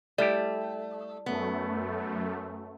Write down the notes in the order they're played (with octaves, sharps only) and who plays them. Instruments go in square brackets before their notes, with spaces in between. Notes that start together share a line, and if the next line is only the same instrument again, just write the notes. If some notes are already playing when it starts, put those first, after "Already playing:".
[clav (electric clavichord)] G3 E4 G4 [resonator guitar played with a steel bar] A3 [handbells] D5
[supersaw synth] F#2 A3 [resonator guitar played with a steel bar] B3